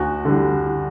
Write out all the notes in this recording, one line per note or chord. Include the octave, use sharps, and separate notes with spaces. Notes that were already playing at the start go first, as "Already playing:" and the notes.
Already playing: D2 F#4
D3 G3